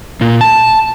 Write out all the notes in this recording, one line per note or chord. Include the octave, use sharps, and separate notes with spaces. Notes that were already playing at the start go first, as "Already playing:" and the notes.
A#2
A5